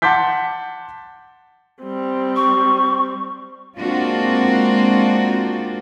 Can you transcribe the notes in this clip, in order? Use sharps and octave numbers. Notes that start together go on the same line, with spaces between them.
F#5 A5 C6 D6 G6 B6
G3 C4
C#6
G#3 A#3 C4 D4 F4 F#4